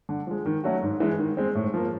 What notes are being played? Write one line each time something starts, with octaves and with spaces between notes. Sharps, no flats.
D3
F3 G#3
D#3
F#3 A3 C#4 F#4
G#2
E3 G#3
D#3
G#3 C4
A2
F3 A#3